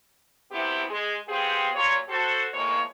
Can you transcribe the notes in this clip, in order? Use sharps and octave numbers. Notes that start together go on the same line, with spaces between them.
D2 C3 B3 C4 E4 G4
G#3 G#4
B3 C4 F4 G4 G#4
A#2 F#3 F4 C#5
F#4 A4 C5
F2 A2 G#3 A#3 C#5